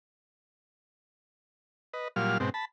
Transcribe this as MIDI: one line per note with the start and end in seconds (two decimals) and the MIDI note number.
1.94 2.08 71
1.94 2.08 75
2.16 2.38 46
2.16 2.38 54
2.16 2.38 55
2.16 2.38 65
2.16 2.38 89
2.40 2.50 44
2.40 2.50 47
2.40 2.50 60
2.54 2.65 81
2.54 2.65 83